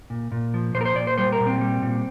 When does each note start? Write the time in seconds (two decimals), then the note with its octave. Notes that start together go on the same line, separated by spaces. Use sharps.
0.10 A#2
0.32 A#2
0.54 F3
0.74 A#2 C5
0.81 A#4
0.85 C5
0.96 A#2 D5
1.07 C5
1.18 G3 C5
1.32 A#4
1.40 A#2
1.47 C4
1.61 G3
1.82 A#2